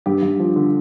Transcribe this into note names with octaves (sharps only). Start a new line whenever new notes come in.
G2 G4
G2
F3
D3